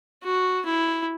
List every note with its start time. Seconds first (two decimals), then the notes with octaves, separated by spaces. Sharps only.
0.24 F#4
0.66 E4